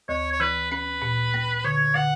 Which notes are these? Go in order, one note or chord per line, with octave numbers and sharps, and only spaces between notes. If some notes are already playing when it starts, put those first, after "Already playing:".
D2 C#5
C#5
E3 B4
C#4 B4
A#2
A#3
D3 C#5
D3 F#5